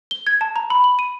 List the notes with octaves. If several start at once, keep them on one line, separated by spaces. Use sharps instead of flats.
G7
G#6
A5
A#5
B5
F#7
D#7